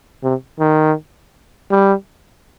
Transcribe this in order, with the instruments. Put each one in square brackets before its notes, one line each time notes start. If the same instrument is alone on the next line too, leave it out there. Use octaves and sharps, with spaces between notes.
[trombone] C3
D#3
G3